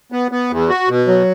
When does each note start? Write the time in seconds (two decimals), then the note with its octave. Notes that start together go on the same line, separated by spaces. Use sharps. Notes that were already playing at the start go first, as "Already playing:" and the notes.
0.12 B3
0.31 B3
0.50 E2
0.69 F#4
0.88 B2
1.07 F#3